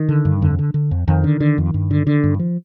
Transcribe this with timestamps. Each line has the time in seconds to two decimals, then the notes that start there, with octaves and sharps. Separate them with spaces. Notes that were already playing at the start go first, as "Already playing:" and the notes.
Already playing: D#3
0.09 D3
0.25 G2
0.42 F2 D3
0.59 D3
0.74 D3
0.91 F2
1.08 F2 D#3
1.24 D3
1.40 D3
1.58 F2
1.74 G2
1.91 D3
2.07 D3
2.24 G2
2.39 F3